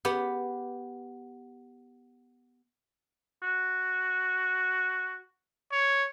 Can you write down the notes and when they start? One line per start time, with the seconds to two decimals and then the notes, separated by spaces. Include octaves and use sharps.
0.05 B3 G4 B5
3.42 F#4
5.72 C#5